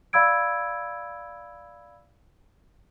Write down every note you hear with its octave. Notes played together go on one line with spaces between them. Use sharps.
D5 F5 B5 E6 G#6 D7